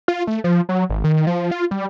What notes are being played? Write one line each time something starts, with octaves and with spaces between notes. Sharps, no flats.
F4
A3
F3
F#3
G#1
D#3
F3
F4
G3